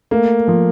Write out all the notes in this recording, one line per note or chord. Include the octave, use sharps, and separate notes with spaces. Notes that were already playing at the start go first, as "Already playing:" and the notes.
A3 A#3
F3